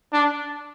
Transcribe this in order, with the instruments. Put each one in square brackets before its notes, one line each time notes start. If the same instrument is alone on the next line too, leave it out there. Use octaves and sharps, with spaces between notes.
[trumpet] D4